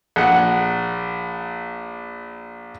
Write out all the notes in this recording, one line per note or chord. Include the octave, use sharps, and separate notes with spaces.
A#1 F#5